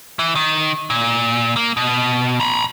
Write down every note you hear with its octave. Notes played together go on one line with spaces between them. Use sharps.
E3
D#3
A#2
A#3
B2
A#5 B5